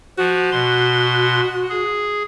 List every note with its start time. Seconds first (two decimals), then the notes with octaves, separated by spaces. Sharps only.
0.18 F3 F#4
0.52 B2 C6
1.70 G#4